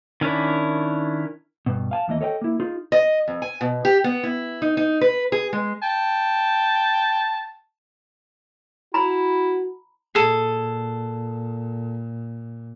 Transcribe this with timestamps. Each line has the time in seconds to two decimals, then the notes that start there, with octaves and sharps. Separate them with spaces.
0.21 D#3 C#4 D4 E4
1.66 G2 B2
1.91 F5 G#5 A5
2.08 D#2 E3 A#3 D#5
2.21 A4 C#5 D#5 F5 G5
2.41 A#3 E4
2.60 D#4 F4 G#4
2.92 D#5
3.28 F2
3.42 G#5
3.61 B2
3.85 G4
4.04 B3
4.23 E4
4.62 D#4
4.77 D#4
5.01 B4
5.32 G#4
5.53 G#3
5.83 G5 A5
8.94 E4 F#4 A#5 B5
10.15 A#2 G#4 A4